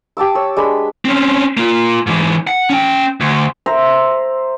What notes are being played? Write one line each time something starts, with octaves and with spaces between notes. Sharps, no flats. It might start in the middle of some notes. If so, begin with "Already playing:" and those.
G4 A5 D6 E6
C#5 E6
G#3 D4 B4 B5
C4 C#4
A#3 F4
G#2 E3
F#5
C#4 G5
D2
C5 E5 A#5